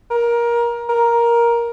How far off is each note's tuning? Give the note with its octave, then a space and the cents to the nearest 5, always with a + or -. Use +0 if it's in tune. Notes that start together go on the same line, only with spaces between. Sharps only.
A#4 +20
A#4 +10